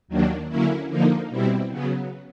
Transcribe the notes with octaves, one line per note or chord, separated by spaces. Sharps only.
D#2 D#3 F#3 A#3 D4
D3 F#3 A#3 C#4 E4
D3 F3 A#3 D#4
B2 G3 C4 E4
C#3 F#3 B3